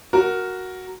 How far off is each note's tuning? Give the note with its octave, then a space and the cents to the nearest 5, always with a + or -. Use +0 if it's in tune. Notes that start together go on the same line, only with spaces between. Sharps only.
F#4 +0 A#4 +0